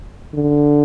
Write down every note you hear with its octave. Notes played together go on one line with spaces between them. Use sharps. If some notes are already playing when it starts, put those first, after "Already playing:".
D3